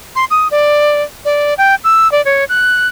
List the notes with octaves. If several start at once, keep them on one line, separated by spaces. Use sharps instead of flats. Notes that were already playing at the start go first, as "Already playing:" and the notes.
C6
D#6
D5
D5
G5
E6
D5
C#5
F#6